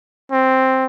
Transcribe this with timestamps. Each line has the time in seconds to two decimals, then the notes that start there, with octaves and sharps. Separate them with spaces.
0.32 C4